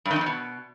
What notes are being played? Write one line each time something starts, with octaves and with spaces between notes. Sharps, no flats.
G2
D#3
F2
A2
B2